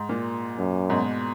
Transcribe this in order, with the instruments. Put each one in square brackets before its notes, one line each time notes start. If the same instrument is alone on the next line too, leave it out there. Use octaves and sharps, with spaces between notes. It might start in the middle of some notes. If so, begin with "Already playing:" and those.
Already playing: [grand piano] G#2
A#2
[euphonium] F#2
[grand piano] G#2 B2